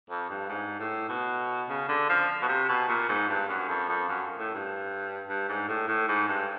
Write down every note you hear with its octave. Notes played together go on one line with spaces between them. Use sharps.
F2
G2
G#2
A2
B2
C#3
D3
F3
B2
C3
B2
A#2
G#2
G2
F#2
F2
F2
F#2
A2
G2
G2
G#2
A2
A2
G#2
G2